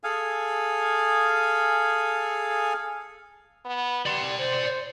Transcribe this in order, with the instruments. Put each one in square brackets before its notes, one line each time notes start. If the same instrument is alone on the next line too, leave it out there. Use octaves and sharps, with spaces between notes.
[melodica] G#4 A4 F5 G#5
[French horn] B3
[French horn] G3 [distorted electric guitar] D5 C6
[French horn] C5